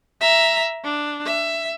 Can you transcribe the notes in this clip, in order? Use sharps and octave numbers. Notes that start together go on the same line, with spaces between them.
E5 A#5
D4
E5